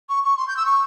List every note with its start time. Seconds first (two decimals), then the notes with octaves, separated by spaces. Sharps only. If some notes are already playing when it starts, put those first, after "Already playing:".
0.09 C#6
0.23 C#6
0.37 C6
0.48 G6
0.57 E6
0.65 C#6